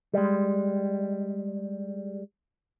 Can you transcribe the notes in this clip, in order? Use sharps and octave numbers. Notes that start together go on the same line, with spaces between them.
G3 G#3